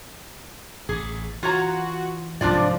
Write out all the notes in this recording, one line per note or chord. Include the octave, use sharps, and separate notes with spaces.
A1 A2 G#4
E3 F4 F#4 C#5 A#5
C2 G#2 F3 F#3 D4 F4 D5